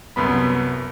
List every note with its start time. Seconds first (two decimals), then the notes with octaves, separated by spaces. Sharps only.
0.16 C2 F#2 B3 B5